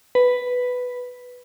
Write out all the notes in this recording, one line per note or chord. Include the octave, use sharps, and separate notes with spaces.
B4